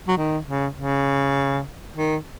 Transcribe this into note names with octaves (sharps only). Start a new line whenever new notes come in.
F#3
D#3
C#3
C#3
D#3